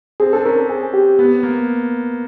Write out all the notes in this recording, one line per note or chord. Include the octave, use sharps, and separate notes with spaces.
C4 G#4
D4 A4
C#4 A#4
A4
C4 G#4
G4
B3
A#3